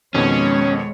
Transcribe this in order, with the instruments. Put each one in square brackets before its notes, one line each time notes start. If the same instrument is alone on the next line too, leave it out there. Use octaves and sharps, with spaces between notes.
[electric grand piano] F2 B2 D#3 [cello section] G#3 C#5 [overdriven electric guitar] C#4